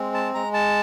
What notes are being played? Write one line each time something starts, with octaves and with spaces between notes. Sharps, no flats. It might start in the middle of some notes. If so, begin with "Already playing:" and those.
Already playing: G#3 C4
A5
G#3 A#5
A5